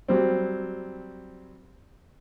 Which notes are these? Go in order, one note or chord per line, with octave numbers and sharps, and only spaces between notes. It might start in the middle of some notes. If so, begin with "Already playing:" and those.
F#3 G3 C4